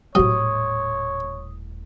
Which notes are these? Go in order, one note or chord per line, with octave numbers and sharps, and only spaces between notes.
D#1 A2 C3 F#3 C#5 D#6